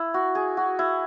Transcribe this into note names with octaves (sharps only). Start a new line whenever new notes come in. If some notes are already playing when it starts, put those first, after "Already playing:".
Already playing: E4
F#4
G#4
F#4
E4